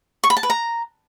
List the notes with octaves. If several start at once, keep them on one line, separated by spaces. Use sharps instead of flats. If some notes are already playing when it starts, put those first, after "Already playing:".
C#6
B5
A5
B4
A#5